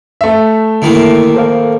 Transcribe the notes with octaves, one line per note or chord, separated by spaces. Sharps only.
A3 E5
A2 D3 D#3 A#3 E4
A4 C5 F5